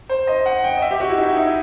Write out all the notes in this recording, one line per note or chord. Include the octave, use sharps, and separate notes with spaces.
C5
D#5
F#5
G5
D#5
E5
G4
F#4
E4
D#4
E4
D#4
E4